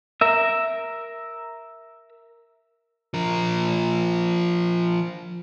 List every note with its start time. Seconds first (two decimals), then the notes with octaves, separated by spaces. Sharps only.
0.21 A#4 E5
3.14 F3 A#4